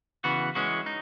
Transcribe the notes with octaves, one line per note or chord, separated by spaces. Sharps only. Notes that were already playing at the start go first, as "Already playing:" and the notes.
C#3 E3 B3 F#4
E3 G#3 C#4 F#4
D#4